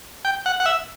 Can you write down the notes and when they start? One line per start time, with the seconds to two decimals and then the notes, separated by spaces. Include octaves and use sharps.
0.25 G5
0.46 F#5
0.60 F#5
0.66 E5